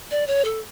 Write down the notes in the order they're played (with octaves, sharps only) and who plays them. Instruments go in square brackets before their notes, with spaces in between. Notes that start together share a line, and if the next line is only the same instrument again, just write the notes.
[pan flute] D5
C#5
A4